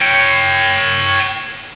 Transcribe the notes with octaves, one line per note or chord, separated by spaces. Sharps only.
C#5 G5